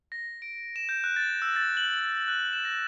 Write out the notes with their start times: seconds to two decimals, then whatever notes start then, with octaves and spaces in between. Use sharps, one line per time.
0.12 A#6
0.42 D7
0.76 E7
0.89 G6
1.04 F#6
1.16 A6
1.42 E6
1.56 A6
1.77 F#7
2.28 F#6
2.53 E7
2.65 A#6